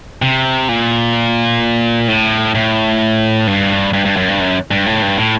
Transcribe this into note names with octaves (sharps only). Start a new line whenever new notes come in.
C3
A#2
A2
A2
G2
G2
G2
F#2
G2
F#2
G2
A2
G2
A2